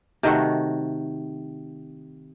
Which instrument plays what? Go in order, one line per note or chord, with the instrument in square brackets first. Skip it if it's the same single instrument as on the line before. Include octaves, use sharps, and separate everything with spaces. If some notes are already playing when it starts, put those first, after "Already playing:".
[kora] C3 D#3 A3 F#4